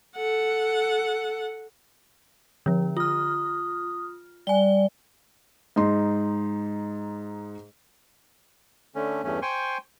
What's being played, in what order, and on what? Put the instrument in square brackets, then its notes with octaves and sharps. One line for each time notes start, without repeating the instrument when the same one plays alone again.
[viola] A4 F#5
[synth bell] D3 F3
[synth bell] F4 F6 [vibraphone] D#6
[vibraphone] G3 D5 [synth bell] G#5 G7
[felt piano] G#2 D#4 C6
[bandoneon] D3 A3 C#4
E2 G2 A3 C#4
C5 G5 G#5 C6 C#6